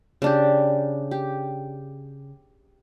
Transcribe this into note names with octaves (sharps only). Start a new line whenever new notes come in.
C#3 D4 G4
G4